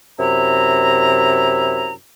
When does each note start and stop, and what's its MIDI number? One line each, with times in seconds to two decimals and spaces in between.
0.19 1.93 42
0.19 1.93 48
0.19 1.93 64
0.19 1.93 82